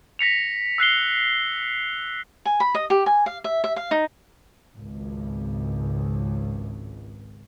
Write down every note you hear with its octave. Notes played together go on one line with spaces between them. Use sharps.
A#6 B6 C#7 F7
E6 F#6 C7 G7
G#5
B5
D#5
G4
G#5
F5
E5
E5
F5
D#4
G#1 C#2